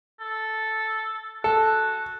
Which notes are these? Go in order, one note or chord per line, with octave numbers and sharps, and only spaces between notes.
A4
F#4 A4